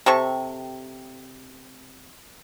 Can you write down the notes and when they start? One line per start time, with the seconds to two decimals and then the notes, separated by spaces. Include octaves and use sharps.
0.06 C3 G4 A4 C#6